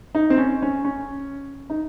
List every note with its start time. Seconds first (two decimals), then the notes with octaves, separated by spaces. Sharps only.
0.15 D#4
0.30 C4
0.38 C#4
0.62 C#4
0.85 C#4
1.70 D#4